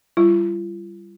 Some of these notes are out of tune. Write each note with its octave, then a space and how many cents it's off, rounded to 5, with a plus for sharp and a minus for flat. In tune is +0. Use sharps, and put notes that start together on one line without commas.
G3 +0 F4 -40